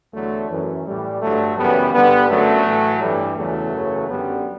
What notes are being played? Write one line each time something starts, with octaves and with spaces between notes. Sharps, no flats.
E2 D3 F#3 A3
F#2 E3
A2 E3 G3
G2 D3 F#3 A3
F#2 C#3 E3 G3 B3
G2 D3 G3 B3
F#2 D3 F#3 A3
A2 E3
G2 E3 G3
E2 C#3 E3 F#3 A3
F#2 C#3 E3
F#2 D3 G3 B3